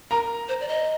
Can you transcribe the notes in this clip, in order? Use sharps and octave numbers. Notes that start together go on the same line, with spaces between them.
A#4 A#5
C5
D5
D#5